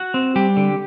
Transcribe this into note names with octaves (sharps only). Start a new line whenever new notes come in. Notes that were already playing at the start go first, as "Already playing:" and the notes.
Already playing: F#4
C4
G3 G4
D3